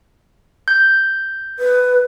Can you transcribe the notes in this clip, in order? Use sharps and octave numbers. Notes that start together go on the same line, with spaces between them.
G6
B4